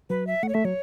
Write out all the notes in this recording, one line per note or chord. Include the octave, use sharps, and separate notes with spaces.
F#3 B4
E5
A3 F#5
C#5
A3 E5
F#3 C#5